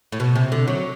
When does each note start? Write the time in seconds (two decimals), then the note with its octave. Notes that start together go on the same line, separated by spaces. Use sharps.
0.12 A2
0.20 B2
0.36 C3
0.52 D3
0.68 F#3